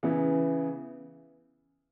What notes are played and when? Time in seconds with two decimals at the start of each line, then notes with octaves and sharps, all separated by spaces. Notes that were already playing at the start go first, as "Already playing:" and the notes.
0.03 C#3 E3 B3 E4